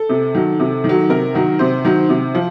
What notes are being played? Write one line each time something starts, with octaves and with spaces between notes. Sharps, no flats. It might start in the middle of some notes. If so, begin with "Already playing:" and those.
Already playing: A4
C3
D#3 F#3
C3
D#3
F#3
C3 A#4
D#3 F#3
C3 C5
D#3 F#3
C3
F3